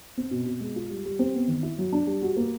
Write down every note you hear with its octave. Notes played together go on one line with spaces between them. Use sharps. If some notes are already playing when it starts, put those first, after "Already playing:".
C4
B2
B2
G#3
F4
G3
G3
C4
B3
D#3
E4
F#3
D4
G3
F#4
A#3